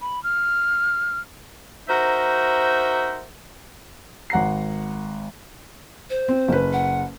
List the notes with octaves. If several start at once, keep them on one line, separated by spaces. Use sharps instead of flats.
B5
F6
D#4 F#4 A#4 C5 E5
G#1 F#5 A#5 C7
C5
C4
F#1 B4
F#5